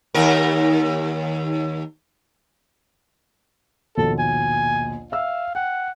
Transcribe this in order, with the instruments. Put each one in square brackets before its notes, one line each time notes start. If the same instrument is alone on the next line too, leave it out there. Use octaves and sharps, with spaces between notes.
[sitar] D#2 A#4
[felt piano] A#1 D#2 B2 [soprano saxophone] A4
[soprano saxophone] G#5
[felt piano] E5 E6 [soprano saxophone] F5
[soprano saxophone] F#5 [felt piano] G5